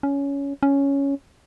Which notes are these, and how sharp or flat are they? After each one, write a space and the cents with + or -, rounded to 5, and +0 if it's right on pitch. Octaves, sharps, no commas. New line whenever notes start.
C#4 +15
C#4 +5